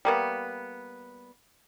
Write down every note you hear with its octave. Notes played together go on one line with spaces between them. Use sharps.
G3 A#3 B3